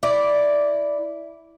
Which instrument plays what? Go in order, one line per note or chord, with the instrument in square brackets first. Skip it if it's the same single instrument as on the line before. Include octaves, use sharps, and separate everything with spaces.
[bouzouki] E4 D5